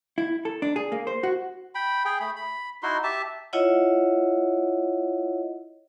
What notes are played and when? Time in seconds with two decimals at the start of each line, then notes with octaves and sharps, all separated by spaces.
0.18 E4
0.45 A4
0.62 D4
0.76 G#4
0.92 A#3
1.07 C5
1.23 F#4
1.75 G5 B5
2.05 G#4 G5
2.20 A3 B5
2.36 B5
2.83 D#4 E4 F#4 C6
3.03 G4 E5 A5
3.53 E4 F4 C#5 D#5 E5 F#5